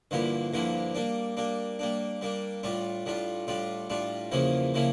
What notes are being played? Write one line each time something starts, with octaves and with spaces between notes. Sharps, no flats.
G2 D3 F3 A#3 E4
G2 D3 F3 A#3 E4
G3 A#3 D4
G3 A#3 D4
G3 A#3 D4
G3 A#3 D4
A2 G3 D4 F4
A2 G3 D4 F4
A2 G3 D4 F4
A2 G3 D4 F4
E2 C#3 F3 A#3 E4
C#3 F3 A#3 E4